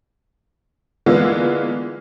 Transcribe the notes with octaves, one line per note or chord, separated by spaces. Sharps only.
D3 E3 G#3 A#3 B3 F4